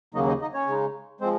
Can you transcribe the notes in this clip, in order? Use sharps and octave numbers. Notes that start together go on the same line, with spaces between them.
D#2 C#3 F#3 A#3 D#4 D#5
D#4 D#5
D#4 D#5
C#4 C#5
C#3 G#3 D#4
F3 G#3 C4 C5